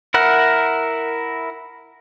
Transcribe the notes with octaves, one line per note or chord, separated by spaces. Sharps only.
E4 A#4 F#5